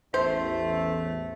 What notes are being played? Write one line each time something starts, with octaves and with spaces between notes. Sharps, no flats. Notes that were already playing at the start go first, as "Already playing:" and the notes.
A1 E2 A3 C5